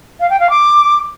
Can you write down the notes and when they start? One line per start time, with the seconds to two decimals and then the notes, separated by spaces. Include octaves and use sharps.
0.20 F5
0.30 G5
0.40 F5
0.50 D6